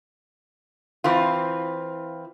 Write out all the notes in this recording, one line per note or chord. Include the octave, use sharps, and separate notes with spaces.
E3 C4 F4